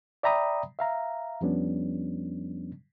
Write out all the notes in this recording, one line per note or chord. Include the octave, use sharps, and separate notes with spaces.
D5 E5 G5 A#5 B5 D#6
E5 F5 A#5
F2 F3 G3 B3 C#4 D4